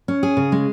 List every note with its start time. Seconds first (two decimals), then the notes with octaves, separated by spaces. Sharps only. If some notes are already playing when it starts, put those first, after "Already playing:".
0.08 C#4
0.23 G#4
0.37 C#3
0.52 G#3